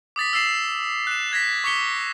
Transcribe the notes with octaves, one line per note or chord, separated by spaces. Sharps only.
D6 D#6 A6 B6
E6 A6 C7 E7
F#6 E7
F#6 G#6 A#6 B6
C#6 D6 B6 C#7 G7